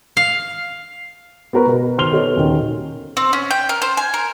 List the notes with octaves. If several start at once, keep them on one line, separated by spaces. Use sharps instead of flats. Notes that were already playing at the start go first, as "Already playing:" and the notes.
F5
B3 F#4 A#4 B4
B2
D#3 C5 C6 F6 F7 G7
B3 F#4 A4 C#5 D#5
D#1 D#3
C4
C#4
G5
A#4
C5
G#5
A#4